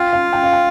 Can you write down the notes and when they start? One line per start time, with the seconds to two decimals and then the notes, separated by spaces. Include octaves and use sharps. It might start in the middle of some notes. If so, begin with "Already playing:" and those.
Already playing: F4 G5
0.13 F5
0.33 G5
0.43 F5
0.53 G5